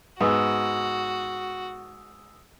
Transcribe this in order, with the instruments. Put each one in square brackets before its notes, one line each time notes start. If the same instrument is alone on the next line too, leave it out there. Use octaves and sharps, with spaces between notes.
[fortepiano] G#2 B3 [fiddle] F#4 [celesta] D#6 E6